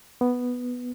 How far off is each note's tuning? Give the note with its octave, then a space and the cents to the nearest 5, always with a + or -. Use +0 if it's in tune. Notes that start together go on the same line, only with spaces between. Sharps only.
B3 +0